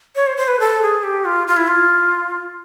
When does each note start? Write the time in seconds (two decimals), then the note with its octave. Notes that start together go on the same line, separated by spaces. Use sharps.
0.16 C#5
0.27 C5
0.37 C5
0.48 B4
0.60 A4
0.82 G#4
1.04 G4
1.25 F4
1.47 F4
1.57 E4
1.68 F4